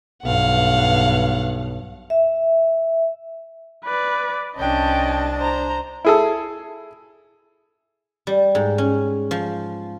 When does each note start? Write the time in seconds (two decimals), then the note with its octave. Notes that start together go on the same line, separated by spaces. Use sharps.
0.24 B1 G2 F5 F#5
2.10 E5
3.84 B4 D5
4.57 C2 C#4 D4 D#5 G5 A5
5.38 C5 A#5
6.05 E4 G#4 A4
8.27 G3
8.55 G#2
8.78 C#4
9.31 F3